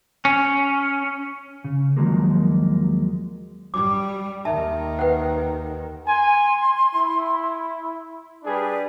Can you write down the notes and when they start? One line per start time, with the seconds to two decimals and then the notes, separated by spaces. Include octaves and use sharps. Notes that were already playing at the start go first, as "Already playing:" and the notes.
0.25 C#4
1.64 C#3
1.96 D#2 D#3 F3 F#3 G#3 A#3
3.74 G3 D6
4.45 D#2 D#3 E5 A5
4.99 B4 C5 F#5 G5
6.07 G#5 C6
6.95 E4
8.44 G3 D4 G#4 B4 D5